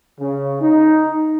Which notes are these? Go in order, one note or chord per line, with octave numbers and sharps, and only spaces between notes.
C#3
D#4